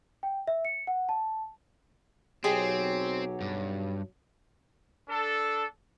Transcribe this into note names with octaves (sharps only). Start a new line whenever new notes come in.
G5
E5
C#7
F#5
A5
B1 F#3 C4 G4 G#4 D#5
G2
D4 A4